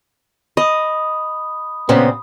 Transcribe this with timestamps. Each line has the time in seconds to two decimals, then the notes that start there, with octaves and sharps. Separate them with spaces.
0.57 D#5 B5 D#6
1.89 A#2 C#3 B3 C4